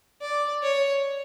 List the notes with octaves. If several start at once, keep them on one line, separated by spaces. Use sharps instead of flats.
D5
C#5